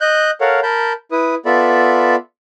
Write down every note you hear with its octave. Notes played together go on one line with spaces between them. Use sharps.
D#5 F#6 G6
A4 A#4 C#5 F5 F#5
A#4 A5 B5 G6
E4 B4 D#6
B3 F4 A4 D5 E5 B5